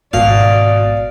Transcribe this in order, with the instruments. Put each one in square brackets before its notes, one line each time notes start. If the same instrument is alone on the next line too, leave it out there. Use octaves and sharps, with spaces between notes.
[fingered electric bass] G#1 G#2 [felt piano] B2 [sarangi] D5 [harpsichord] F5